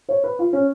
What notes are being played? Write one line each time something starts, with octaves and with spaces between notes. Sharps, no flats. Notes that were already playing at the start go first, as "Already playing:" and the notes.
C#5
B4
F4
C#4